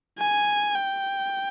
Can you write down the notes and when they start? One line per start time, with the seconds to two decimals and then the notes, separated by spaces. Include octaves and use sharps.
0.19 G#5
0.75 G5